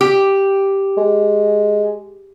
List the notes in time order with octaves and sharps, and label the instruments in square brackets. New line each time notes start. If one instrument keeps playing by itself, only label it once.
[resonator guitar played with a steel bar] G4
[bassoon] G#3